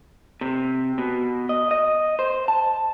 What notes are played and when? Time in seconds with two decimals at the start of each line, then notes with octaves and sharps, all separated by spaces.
0.41 C3
0.98 B2
1.49 D#5
1.71 D#5
2.19 C5
2.48 A5